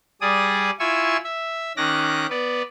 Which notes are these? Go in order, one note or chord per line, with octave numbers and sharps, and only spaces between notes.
G3 G#4 D5 D#6
E4 F4 G#5 C#6 E6
E5
D#3 C#4 D6 F#6 A#6
B3 B4 D5